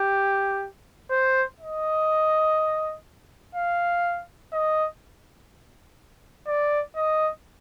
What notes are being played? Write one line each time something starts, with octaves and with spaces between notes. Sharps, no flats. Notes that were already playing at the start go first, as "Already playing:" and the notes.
Already playing: G4
C5
D#5
F5
D#5
D5
D#5